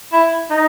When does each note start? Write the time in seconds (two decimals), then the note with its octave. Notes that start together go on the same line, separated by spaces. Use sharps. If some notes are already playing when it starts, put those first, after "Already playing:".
0.12 E4
0.50 D#4